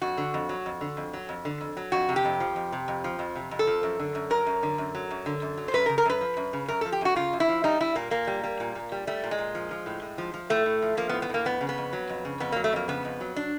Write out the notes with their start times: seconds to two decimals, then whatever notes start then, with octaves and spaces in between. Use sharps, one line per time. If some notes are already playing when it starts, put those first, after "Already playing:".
0.02 F2 F#4
0.17 D3
0.34 F2
0.49 F#3
0.66 F2
0.81 D3
0.97 F2
1.13 F#3
1.29 F2
1.45 D3
1.60 F2
1.77 F#3
1.92 F2 F#4
2.09 C3
2.16 G4
2.25 F2
2.40 F3
2.56 F2
2.72 C3
2.88 F2
3.04 F3
3.19 F2
3.35 C3
3.51 F2
3.59 A4
3.67 F3
3.83 F#2
4.00 D3
4.15 F#2
4.30 F#3 A#4
4.46 F#2
4.63 D3
4.78 F#2
4.95 F#3
5.11 F#2
5.26 D3
5.42 F#2
5.57 F#3
5.68 C5
5.74 F#2 B4
5.86 A#4
5.89 C#3
5.98 A#4
6.05 F#2 B4
6.21 F3
6.37 F#2
6.53 C#3
6.68 F#2 A#4
6.81 F3 A4
6.92 G4
7.01 F#2 F#4
7.16 C#3 F4
7.33 F#2
7.40 E4
7.49 F3
7.64 G3 D#4
7.80 G3 E4
7.95 A#2 A#3
8.11 A#2 A#3
8.27 G3
8.44 G3
8.60 A#2
8.75 A#2
8.92 G3
9.07 G3 A3
9.24 A#2
9.31 G#3
9.38 A#2
9.55 F3
9.71 F3
9.86 A2
10.02 A2
10.18 F3
10.34 F3
10.50 A2 A3
10.66 A2
10.82 F3
10.97 F3 A#3
11.09 B3
11.13 A2
11.22 B3
11.30 A2 A#3
11.45 F2 B3
11.61 C#3
11.69 B3
11.78 F2
11.93 F#3
12.09 F2
12.25 C#3
12.40 F2 B3
12.52 F#3 A#3
12.64 A3
12.73 F2 A#3
12.88 C#3 B3
13.05 F2
13.21 F#3
13.36 D4